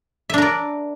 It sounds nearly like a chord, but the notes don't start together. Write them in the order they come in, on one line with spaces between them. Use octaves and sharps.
E5 D4 A#4 D5